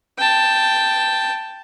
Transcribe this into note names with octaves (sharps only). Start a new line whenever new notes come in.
G5 A5